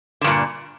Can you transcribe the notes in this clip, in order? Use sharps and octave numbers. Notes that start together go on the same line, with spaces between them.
G2 A#2 D3